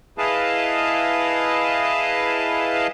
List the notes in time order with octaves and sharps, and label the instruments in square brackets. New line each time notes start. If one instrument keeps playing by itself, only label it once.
[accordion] E4 G#4 B4 D#5 F5 A5